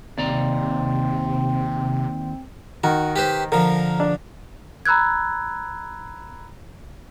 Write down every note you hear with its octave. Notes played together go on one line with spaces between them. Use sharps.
D#2 C3 C4 D5 A#5
D#3 F#4
G4 B4 C5
D3 F3 A#4
D4
A#5 B5 E6 F#6 G#6